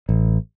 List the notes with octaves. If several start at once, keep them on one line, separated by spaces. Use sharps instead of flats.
A1